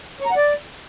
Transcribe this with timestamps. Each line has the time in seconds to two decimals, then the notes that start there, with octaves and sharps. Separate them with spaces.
0.20 C#5
0.26 A#5
0.31 F#5
0.36 D5